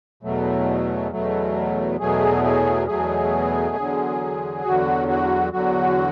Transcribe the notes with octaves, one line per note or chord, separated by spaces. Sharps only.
E2 B2 F#3 A3
E2 B2 F#3 A3
E2 B2 F#3 A3 G#4
G#4
E2 B2 F#3 A3 G#4
E2 D3 F#3
E2 D3 F#3 F#4
F#4
E2 D3 F#3 F#4